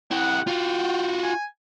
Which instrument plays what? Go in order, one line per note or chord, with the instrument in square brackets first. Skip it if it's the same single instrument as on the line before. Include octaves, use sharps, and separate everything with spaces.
[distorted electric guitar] E4 G4 [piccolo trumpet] F#5
[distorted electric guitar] F4 F#4 [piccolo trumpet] G5
[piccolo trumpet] G#5